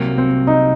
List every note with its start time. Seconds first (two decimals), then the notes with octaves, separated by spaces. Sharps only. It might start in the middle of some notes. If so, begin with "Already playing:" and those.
Already playing: C2 C3 F#3 A#3
0.18 C4
0.47 D#4